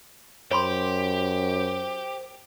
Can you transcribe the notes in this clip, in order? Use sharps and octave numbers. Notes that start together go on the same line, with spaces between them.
F#2 G4 C5 C#5 B5 C6